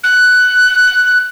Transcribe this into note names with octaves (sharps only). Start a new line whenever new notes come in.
F#6